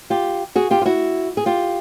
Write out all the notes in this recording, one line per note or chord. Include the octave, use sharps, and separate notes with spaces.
F4 G4
F#4 G#4
F4 G4
F4
E4 F#4
G#4
F4 G4